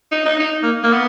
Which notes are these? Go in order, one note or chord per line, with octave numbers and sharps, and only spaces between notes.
D#4
D#4
D#4
A#3
A#3
B3